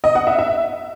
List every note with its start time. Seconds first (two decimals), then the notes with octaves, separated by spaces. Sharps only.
0.04 D#5
0.15 F#5
0.27 E5
0.39 E5